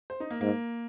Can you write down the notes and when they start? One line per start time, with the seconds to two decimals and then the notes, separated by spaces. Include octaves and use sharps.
0.10 C5
0.20 D#4
0.30 A#3
0.41 G#2 A#3